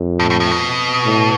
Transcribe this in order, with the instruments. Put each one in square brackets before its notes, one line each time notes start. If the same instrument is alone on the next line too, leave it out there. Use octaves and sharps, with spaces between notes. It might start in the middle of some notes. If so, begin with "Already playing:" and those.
Already playing: [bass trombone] F2
[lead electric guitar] A2
A2
A2
B2
[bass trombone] A2